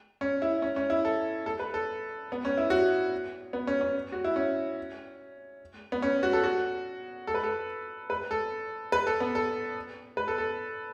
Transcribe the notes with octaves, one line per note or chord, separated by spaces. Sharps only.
C#4
E4
C#4
C#4
E4
A4
A4
B4
A4
B3
C#4
E4
F#4
B3
C#4
C#4
F#4
E4
C#4
B3
C#4
F#4
A4
F#4
A4
B4
A4
B4
A4
B4
A4
B3
A4
B4
A4
A4